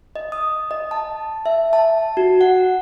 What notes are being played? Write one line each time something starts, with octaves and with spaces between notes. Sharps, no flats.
D#5
D#6
D#5
A5
E5
A5
F#4
F#5